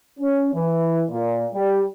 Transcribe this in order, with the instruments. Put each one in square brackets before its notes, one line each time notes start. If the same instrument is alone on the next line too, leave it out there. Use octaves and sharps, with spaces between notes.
[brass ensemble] C#4
E3
A#2
G3